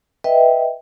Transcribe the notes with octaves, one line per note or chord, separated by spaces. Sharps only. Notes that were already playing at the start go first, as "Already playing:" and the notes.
B4 D#5 E5 G5